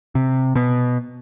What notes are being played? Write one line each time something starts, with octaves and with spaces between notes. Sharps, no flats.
C3
B2